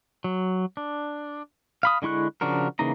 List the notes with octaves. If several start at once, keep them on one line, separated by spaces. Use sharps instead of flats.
F#3
D4
F5 B5 D#6
D3 G#3 E4 C#6 F#6
C#3 F3 D4 F#4 A#4
C#3 E3 A#3 D#4 A#5